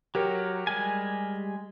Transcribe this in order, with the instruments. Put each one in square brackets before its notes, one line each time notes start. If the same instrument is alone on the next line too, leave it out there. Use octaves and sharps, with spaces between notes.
[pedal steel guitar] F#3 C#5 [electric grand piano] G4 A#4
[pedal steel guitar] G3 G#3 G#5